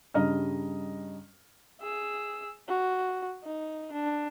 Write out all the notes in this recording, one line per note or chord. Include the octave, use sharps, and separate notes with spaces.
G2 C#3 G3 D#5 A#5 F6
G#4 E6
F#4
D#4
D4